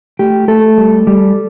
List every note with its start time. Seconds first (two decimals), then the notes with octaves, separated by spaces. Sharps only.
0.19 A3 G4
0.48 A3 A4
0.78 G3
1.07 G3